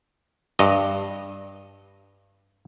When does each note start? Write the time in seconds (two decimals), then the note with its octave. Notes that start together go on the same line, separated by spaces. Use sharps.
0.59 G2 D#5